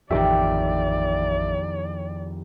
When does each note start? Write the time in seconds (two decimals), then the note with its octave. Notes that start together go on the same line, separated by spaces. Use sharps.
0.11 A1 F2 D#3 G4 D5 E5 D6